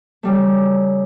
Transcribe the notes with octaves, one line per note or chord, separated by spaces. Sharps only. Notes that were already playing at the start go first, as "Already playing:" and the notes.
C#3 G3 A3